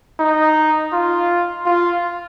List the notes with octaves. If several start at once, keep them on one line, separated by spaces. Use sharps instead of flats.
D#4
F4
F4